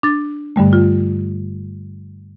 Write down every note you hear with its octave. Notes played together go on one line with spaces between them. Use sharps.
D4 A6
G2 D3 G3 A3
F4